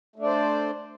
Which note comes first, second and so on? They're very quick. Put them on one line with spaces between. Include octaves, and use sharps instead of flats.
A3 D4 D5 C5